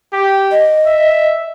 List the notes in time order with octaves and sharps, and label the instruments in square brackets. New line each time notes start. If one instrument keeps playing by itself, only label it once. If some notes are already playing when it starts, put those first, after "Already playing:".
[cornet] G4
[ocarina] D#5
[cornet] E5